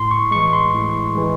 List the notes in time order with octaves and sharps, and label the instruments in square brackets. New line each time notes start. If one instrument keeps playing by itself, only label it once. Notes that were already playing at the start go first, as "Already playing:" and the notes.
Already playing: [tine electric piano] A2 C6
C#6
E3 G#3 C#6
C6
A2
E3 G#3